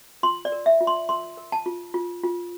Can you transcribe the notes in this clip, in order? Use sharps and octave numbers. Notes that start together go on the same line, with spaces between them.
F4 C6
D5
A#4
E5
F4
C6
A#4 C6
A#4
A5
F4
F4
F4